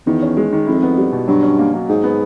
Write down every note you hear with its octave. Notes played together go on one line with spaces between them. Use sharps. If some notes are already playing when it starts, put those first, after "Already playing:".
E2 D#3
C#4
G#3
D#3
F2 E4
B3
G3
B2
G2 F#3
C#4
A#3
F#3
G#2 D#4
B3